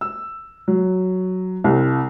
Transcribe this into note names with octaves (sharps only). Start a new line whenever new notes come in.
E6
F#3
C2